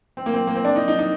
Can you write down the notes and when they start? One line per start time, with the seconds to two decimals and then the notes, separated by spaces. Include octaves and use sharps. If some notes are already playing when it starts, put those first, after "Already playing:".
0.17 C4
0.26 A#3
0.34 C4
0.47 A#3
0.56 C4
0.65 D4
0.76 D#4
0.88 D#4
0.99 D#4